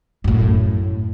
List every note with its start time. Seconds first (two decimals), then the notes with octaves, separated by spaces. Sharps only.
0.24 F#2 A2